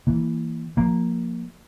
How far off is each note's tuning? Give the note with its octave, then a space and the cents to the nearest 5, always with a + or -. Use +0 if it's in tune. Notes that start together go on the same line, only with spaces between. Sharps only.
E3 +0 A#3 +0
F3 +15 A#3 +0